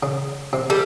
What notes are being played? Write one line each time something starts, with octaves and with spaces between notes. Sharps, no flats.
C#3
C3
G3 A4